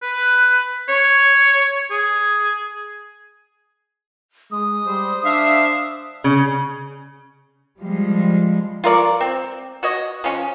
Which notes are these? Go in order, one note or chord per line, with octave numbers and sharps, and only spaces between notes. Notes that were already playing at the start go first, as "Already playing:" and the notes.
B4
C#5
G#4
G#3 D#6
G3 C5
D4 E5 F5
C#3
F3 G3 G#3
F4 A#4 D5 C#6
C4
F#4 C#5 D#5
F3 C#4